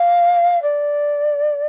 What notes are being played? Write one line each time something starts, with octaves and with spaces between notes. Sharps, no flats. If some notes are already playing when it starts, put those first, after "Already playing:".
Already playing: F5
D5